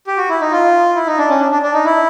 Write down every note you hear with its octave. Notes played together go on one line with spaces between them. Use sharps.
G4
F#4
E4
D#4
F4
E4
D#4
D4
C#4
D4
D4
D4
D#4
E4